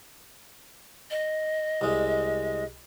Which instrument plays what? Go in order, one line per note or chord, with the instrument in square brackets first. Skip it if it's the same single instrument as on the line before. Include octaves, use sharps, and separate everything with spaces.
[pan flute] D#5
[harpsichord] C2 G#3